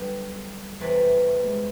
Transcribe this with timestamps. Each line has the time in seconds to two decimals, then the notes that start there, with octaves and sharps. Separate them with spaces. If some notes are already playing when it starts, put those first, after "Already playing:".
Already playing: D3 F#3 G3 B3 G4
0.80 E2 C3 E3 A3
1.44 G#3